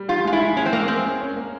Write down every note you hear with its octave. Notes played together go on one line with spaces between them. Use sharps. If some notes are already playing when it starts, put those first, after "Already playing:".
Already playing: G3
F4 G4
G#3 F4
E4
G#3
G#3 C#4
C4
G#3 A#3
G#3 C4
C#4
C#4
A#3